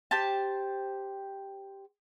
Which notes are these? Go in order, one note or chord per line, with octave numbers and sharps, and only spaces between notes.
G4 C5 A5